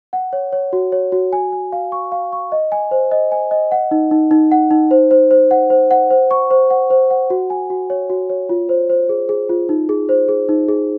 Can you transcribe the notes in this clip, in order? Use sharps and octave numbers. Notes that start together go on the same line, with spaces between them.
F#5
C#5
C#5
F#4
C#5
F#4
G#5
G#5
F5
C#6
F5
C#6
D#5
G#5
C5
D#5
G#5
D#5
F#5
D#4
D#4
D#4
F#5
D#4
C5
C5
C5
F#5
C5
F#5
C5
C#6
C5
F#5
C5
F#5
F#4
G#5
F#4
C#5
F#4
C#5
F4
C5
C5
G#4
G#4
F4
D#4
G#4
C5
G#4
D#4
G#4